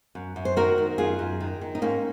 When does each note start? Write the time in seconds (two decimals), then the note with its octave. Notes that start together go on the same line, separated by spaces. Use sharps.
0.15 F#2
0.36 F#2
0.45 C5
0.56 D#3 F#4 A#4
0.78 D#3
0.98 F#2 F4 G#4
1.19 F#2
1.40 D#3
1.61 D#3
1.75 D#4
1.82 G#2 A#3 C#4